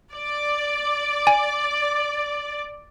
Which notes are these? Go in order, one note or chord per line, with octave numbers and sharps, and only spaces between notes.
D5
G#5